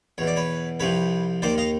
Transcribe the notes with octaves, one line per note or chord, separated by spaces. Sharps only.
E2 B2 C#5
D5
B4 C#5
C2 C3 F3 B4 C#5
D#2 D#3 C5 D5
D#5 F5